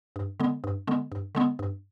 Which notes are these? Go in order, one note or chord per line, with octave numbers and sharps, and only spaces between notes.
G2
D3 G#3 B3
G2
D3 G#3 B3
G2
D3 G#3 B3
G2